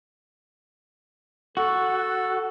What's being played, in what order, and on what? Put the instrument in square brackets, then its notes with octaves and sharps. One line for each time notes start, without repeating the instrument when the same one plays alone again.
[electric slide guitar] F#4 [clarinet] A4